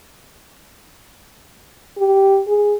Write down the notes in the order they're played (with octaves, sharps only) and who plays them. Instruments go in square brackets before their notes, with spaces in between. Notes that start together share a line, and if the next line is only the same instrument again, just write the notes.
[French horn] G4
G#4